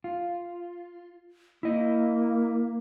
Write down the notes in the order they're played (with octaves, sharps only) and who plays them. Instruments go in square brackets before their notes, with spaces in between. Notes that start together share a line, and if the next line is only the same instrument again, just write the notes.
[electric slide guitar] F4
[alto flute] A#3 [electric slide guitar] E4 D#5